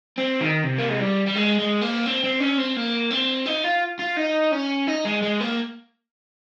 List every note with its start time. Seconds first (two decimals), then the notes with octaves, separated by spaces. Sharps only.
0.18 C4
0.41 D#3
0.64 C3
0.78 A#3
0.89 G#3
0.99 G3
1.26 G3
1.36 G#3
1.59 G#3
1.81 A#3
2.06 C4
2.24 C4
2.40 C#4
2.58 C4
2.76 A#3
3.11 C4
3.46 D#4
3.64 F4
3.99 F4
4.17 D#4
4.53 C#4
4.88 D#4
5.05 G#3
5.22 G#3
5.41 A#3